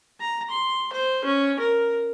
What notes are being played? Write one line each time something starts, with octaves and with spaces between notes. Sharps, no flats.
A#5
C6
C5
C#4
A#4